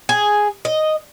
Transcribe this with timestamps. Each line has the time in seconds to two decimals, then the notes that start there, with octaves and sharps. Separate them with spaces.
0.09 G#4
0.65 D#5